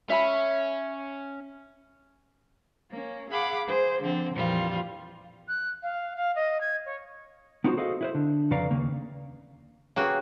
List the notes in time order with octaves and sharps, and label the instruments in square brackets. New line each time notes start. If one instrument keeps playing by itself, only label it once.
[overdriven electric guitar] C#4 [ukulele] E5 B5
[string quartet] A#3 C#4
G#4 F5 F#5 B5 D6
G#4 C5
D3 F3 C4
F2 A#2 E3 G3 F4
[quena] F#6
F5
F5
D#5
G#6
C#5
[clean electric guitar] B3 D#4 F4 F#4 A4 C5
F#4 G#4 A4 C5 D#5 F5
E4 B4 C5
D3
F2 C#3 B4 D5 F5 A#5
D#2 C#3 A#3
[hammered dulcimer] C#3 [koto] A#3 F#4 [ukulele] G#4 B4 G5